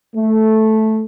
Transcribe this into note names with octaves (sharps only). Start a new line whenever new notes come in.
A3